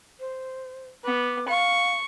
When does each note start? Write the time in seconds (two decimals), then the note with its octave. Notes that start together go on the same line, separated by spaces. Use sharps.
0.20 C5
1.05 B3 D6
1.49 F5 C#6